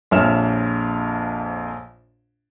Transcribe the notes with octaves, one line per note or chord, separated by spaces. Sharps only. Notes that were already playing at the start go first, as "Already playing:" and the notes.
A#1 F2 C#5 E5 F6 E7